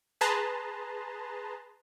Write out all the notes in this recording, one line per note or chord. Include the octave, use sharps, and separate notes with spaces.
G#4 B4 A5 A#5 C6